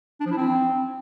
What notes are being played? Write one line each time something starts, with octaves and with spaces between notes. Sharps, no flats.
D4
F3
E4
C4